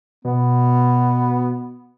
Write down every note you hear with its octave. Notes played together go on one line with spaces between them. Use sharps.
B2 B3